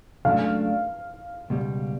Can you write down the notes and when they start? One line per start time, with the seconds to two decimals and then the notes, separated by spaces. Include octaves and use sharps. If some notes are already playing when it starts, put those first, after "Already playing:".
0.25 C#2 C#3 F#3 A3 D4 F5
1.50 C#2 B2 G3